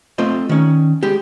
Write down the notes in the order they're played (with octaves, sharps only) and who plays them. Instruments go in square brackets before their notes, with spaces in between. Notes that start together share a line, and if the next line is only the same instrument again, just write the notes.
[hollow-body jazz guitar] A3 C4 F4 C5 D#5
D#3 C#4
G#3 G4